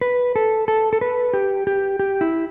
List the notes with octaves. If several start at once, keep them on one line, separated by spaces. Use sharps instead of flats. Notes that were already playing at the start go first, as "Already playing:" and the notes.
B4
A4
A4
A4
B4
G4
G4
G4
E4